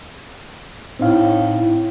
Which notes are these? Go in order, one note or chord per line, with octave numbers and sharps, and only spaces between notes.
A2 C4 D#4 F5